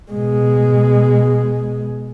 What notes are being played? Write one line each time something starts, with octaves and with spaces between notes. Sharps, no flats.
B2 G#3